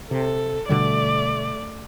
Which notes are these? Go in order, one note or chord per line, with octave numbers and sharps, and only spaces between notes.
C3 A4
B2 D3 G3 A3 D5